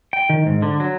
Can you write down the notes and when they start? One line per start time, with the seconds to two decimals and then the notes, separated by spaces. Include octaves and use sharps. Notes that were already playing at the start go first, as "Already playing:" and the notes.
0.13 G5
0.29 D#3
0.46 G#2
0.62 D3
0.80 F#3